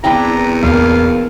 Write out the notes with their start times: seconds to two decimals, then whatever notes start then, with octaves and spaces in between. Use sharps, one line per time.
0.04 E2 C4 D4 E4 G5 A#5 B5
0.63 E1 A3 A#3 F5